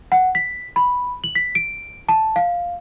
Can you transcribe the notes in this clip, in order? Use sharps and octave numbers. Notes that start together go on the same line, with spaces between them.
F#5
B6
B5
F#7
B6
D7
A5
F5